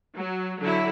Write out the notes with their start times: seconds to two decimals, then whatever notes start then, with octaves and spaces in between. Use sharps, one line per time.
0.16 F#3
0.59 D3 F#3 E4